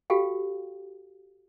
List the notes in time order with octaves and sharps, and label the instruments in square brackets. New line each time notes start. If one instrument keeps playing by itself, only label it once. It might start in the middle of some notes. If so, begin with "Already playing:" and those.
[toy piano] F#4 G4 A4 F5 G5